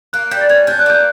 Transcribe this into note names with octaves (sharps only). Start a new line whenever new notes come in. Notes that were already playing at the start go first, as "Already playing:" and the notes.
A#3 F#6
G3 G6
A6
C#4 G#6
D4 G6
F#6
A#3 G6